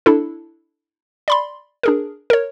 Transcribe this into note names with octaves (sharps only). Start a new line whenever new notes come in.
D4 E4 A4
D5 B5 C6
D4 G#4 A#4
A#4 C#5